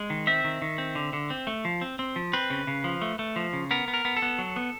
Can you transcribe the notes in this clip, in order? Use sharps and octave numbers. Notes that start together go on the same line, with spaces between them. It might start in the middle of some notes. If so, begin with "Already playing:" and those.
Already playing: G#3
D#3
C4 E5
D#3
D#3
C4
D3
D3
C4
A3
F3
C4
C4
F3
C4 B4
C#3
C#3
F3
A3
A3
F3
C#3
B3 A#4
B3
A#4
B3
A4
B3
F#3
B3